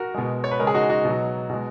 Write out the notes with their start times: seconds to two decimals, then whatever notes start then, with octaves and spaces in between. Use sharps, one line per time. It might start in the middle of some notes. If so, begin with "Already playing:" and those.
Already playing: F#4 A#4
0.14 B2 G#3
0.44 C#5
0.51 B4
0.59 C#3 G#3 A#4
0.67 G#4
0.75 D#4 F#4
0.89 D#4 F#4
1.05 B2 F#3
1.49 B2 G#3